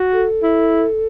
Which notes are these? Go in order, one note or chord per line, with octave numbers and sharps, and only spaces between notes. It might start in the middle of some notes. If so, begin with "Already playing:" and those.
Already playing: F#4
A4
E4